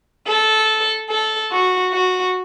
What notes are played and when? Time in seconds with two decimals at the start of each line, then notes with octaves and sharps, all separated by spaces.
0.27 A4
1.11 A4
1.52 F#4
1.94 F#4